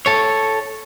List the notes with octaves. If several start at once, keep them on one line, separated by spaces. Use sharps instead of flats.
A4 C#5